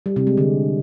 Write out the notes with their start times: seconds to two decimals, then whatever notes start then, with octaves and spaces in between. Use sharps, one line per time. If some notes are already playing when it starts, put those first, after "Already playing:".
0.06 G3
0.16 C3
0.27 G#3
0.37 D3